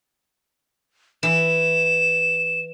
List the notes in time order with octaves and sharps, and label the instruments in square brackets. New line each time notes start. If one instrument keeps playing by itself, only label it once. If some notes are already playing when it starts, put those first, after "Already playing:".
[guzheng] E3 [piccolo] E7